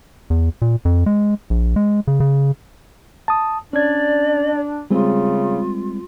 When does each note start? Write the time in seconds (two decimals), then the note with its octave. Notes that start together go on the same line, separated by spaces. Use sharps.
0.30 E2
0.62 A#2
0.85 F2
1.06 G#3
1.50 A#1
1.76 G#3
2.07 C#3
2.20 C#3
3.28 A5 D#6
3.73 C#4 D4 D5 G#6
4.90 C#3 G3 G#3 C4 F4